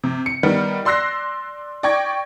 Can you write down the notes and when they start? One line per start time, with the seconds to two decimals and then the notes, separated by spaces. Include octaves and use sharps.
0.04 C3
0.26 C#7
0.43 D#3 G3 B3
0.85 D5 C6 E6 F#6 A#6 C7
1.83 D5 G5 C#6 D6 G#6 A#6